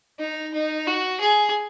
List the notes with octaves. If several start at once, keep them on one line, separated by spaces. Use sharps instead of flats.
D#4
D#4
F#4
G#4